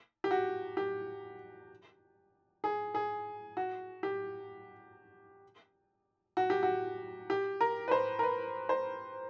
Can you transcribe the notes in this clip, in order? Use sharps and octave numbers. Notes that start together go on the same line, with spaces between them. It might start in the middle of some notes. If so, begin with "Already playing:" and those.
G4
F#4
G4
G#4
G#4
F#4
G4
F#4
G4
F#4
G4
A#4
B4
C5
A#4
B4
C5